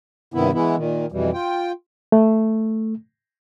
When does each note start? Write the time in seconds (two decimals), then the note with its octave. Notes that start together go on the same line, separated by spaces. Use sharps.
0.34 G2 C3 D#3 B3 E4
0.53 E3 G#3 B3 E4
0.76 A#2 D#3
1.12 F2 B2 E3 G3
1.34 F4 G5
2.12 A3